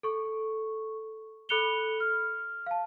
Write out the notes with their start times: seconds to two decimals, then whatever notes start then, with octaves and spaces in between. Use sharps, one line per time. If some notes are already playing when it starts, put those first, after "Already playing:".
0.03 A4 C#6
1.49 A4 B5 F#6 C#7 F7 G7
2.00 F6
2.66 F5 A5